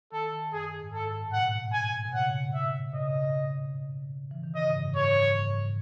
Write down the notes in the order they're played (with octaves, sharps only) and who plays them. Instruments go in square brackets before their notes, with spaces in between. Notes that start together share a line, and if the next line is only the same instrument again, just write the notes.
[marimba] D#3 [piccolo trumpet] A4
[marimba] D#3
[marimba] F#2 [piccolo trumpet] G#4
[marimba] G#2
[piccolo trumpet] A4
[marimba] A2
[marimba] B2 [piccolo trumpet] F#5
[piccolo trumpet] G#5
[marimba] B2
[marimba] C#3 [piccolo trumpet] F#5
[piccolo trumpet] E5
[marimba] C#3 [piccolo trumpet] D#5
[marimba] E3
D#3
[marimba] C#3 [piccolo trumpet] D#5
[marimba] G#2
F#2
[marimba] G#2 [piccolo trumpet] C#5
[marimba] F#2
G#2